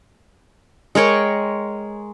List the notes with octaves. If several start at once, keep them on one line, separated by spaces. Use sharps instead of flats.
G#3 A#4 C#5 G5